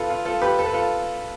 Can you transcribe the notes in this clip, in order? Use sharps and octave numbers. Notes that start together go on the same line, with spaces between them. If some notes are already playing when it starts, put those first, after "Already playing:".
Already playing: F4 A4 B4
F4
F4 A4
G4 B4
A4
B4
F4 A4